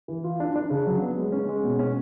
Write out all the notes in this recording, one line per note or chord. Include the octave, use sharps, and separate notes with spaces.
E3
F4
D4
D4
C#3
F#3
B3
G#3
C#4
G#3
B2
C#4